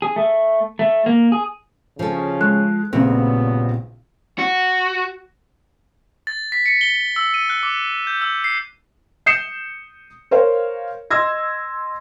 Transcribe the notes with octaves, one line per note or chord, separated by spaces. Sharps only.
G#4
A3
A3
A#3
G#4
D2 C#3 F3 A4
G#3 F#6
A#1 G2 A#2 C#3 F#3 B3 C4
F#4
A6
B6
C#7
G7
E6
D#7
F#6
D6
G6
E6
C7
D#6 G6 C7 C#7 E7
A#4 C5 C#5 F5
D#5 C6 E6 G#6 A#6